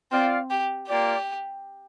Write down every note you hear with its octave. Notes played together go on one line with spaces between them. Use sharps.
C4 F4 D5 F5
G4
A#3 F4 G4 D5